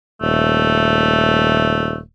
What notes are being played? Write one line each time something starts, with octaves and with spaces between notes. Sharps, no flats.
D#1 A3